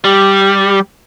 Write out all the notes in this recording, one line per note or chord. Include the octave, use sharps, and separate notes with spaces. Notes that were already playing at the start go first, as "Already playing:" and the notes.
G3 G4